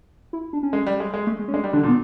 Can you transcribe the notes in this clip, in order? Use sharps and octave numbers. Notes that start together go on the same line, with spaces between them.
E4
D4
C#4
G#3
G3
G#3
G#3
A3
G#3
C#4
G#3 D4
G3
D3 D4
A#2
B3